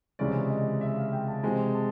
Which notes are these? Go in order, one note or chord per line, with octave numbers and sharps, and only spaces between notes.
C#2 C3 E3 G#3 C#4 D5
D#5
E5
F5
G5
A5
C3 E3 G#3 C4 G#5
A5